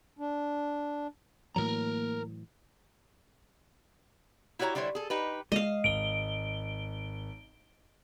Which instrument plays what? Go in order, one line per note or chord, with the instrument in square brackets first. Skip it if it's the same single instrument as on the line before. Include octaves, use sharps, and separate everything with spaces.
[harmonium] D4
[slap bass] A2 E3 F#3 [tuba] A#3 [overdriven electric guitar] A#4 A#5
[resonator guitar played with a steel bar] E4 F#4 G4 C#5 A#5
D3 G3 E4 C5 C#5
G#4 A4
D#4 G4 B4
[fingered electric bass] G#3 [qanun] D#5 F5 [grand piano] E7
[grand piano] G#1 [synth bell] D7 G7